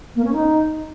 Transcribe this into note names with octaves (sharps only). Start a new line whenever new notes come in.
A#3
C#4
D#4